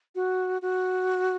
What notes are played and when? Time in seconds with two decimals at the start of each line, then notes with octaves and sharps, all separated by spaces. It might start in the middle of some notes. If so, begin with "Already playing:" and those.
0.15 F#4
0.62 F#4